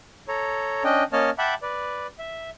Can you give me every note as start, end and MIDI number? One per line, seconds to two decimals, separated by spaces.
0.28 0.83 69
0.28 0.83 73
0.28 0.83 82
0.84 1.04 61
0.84 1.04 62
0.84 1.04 75
0.84 1.04 79
1.13 1.30 58
1.13 1.30 61
1.13 1.30 73
1.13 1.30 75
1.13 1.30 81
1.13 1.30 89
1.38 1.54 76
1.38 1.54 78
1.38 1.54 79
1.38 1.54 81
1.38 1.54 83
1.38 1.54 86
1.62 2.07 71
1.62 2.07 74
2.19 2.50 76